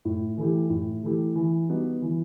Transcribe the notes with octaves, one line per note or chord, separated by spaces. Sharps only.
A2
E3 A3 E4 G4
A2
E3 A3 E4 G4
E3
G3 B3 D#4 F#4
E3